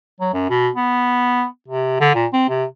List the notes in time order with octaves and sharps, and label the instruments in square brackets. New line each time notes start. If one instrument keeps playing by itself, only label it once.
[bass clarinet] F#3
F#2
B2
B3
C3
D3
A#2
C4
C3